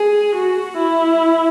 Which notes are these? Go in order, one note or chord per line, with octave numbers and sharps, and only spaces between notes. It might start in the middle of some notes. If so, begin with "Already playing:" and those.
Already playing: G#4
F#4
E4